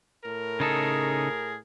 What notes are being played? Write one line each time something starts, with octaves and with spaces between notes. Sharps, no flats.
A2 A#4
C#3 D#4 G#4 A4